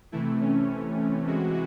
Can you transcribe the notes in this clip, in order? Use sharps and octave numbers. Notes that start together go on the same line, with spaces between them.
C3 E3 A3 E4
C#4
C#4
C3 E3 G#3 F#4